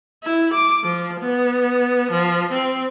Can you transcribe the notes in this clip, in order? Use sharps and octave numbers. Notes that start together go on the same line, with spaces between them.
E4
D6
F3
B3
F3
C4